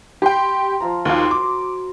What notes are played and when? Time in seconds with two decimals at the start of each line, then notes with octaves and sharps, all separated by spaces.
0.22 G4 G5 B5 C6
0.80 F3 F4 A#5
1.05 D#2 D#3 F4 F#4 C6
1.31 D6